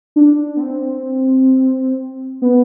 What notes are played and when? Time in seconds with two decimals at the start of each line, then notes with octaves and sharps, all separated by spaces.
0.16 D4
0.56 B3
0.61 C4
2.42 B3